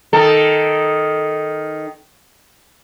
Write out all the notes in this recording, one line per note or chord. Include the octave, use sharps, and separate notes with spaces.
D#3 A4